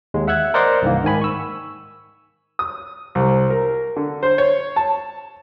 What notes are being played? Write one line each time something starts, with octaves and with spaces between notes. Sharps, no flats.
D#2 G#3
E5 F#5 E6 F#6 G#6
A#4 C5 D5 D#5 F#5 C6
C2 G2 D#3 E3 A#3
G#2 D#3 G#5 B5
C#6 E6
D#6
C2
A#4
D3
C5
C#5
A5